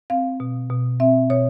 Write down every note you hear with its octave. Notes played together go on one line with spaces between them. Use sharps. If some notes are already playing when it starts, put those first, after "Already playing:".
C4 F5
B2
B2
C4 E5
B2 C#5